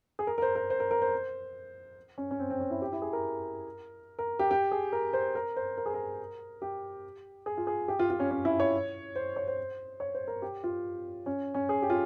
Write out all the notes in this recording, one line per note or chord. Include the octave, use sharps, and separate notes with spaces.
G#4
A#4
A#4
C5
A#4
C5
A#4
A#4
C5
C#4
C#4
C4
C4
C#4
E4
G4
E4
G#4
A#4
A#4
G4
G4
G#4
A#4
C5
A#4
C5
A#4
G#4
A#4
G4
G#4
F4
G#4
G4
F4
F4
C#4
C#4
E4
C#5
C5
C#5
C5
C#5
C5
A#4
G4
F4
C#4
C#4
G#4
G4
F4